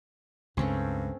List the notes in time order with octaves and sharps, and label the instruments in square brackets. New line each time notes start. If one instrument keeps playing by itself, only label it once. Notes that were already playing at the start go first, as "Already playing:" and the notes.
[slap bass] C#2 C#3 [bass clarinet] G2 [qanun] A3 C4 C#4